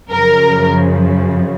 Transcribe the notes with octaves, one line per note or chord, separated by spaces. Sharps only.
F#2 C#3 F3 A#4